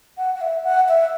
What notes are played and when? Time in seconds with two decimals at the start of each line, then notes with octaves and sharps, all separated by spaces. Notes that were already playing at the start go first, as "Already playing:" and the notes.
0.17 F#5
0.35 F#5
0.41 E5
0.64 F#5
0.88 E5